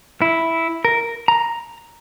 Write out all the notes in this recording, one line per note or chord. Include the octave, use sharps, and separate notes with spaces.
E4
A#4
A#5